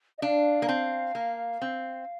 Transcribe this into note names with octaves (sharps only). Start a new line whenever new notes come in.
D#5
D4 F5
A#3
C4
A#3
C4